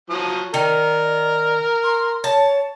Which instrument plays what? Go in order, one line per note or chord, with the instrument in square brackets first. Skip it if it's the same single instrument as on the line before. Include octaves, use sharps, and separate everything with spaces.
[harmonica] F3 F#3 D#6
[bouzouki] D#3 [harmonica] A#4 [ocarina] D5
[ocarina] C6
[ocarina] C#5 [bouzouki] A5